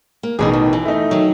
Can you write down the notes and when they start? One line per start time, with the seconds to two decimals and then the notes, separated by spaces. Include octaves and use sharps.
0.23 A#3
0.39 A1 B2 D#3 E3 G#4
0.53 D#3
0.73 E3
0.85 A3 D#4
1.11 D#3 F#3